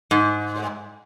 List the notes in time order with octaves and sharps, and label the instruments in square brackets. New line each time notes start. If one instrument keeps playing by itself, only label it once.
[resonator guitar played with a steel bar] G#2